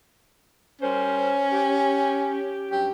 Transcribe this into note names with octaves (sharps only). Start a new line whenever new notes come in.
G3 C#4 A#4 C5
G4
G2 F#3 C#4 G4